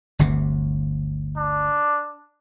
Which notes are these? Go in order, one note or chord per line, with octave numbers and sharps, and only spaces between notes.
G1 D2 C3
D4